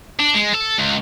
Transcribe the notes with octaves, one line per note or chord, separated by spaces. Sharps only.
D4
G#3
A4
C#2